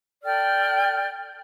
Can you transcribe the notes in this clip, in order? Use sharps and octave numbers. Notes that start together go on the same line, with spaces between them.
A4 D5 G5 F6